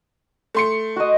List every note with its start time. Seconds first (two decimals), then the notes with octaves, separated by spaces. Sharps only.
0.54 A3 C6 C#7
0.96 F#4 D#5